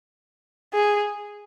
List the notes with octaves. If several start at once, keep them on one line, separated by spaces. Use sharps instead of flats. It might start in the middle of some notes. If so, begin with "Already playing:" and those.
G#4